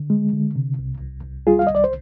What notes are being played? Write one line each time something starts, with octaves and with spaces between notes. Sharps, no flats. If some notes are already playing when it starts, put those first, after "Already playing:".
Already playing: D3
G#3
D3
C3
C2
C2
C2
G3 F4 G#4
F5
C2 D#5
D5
C5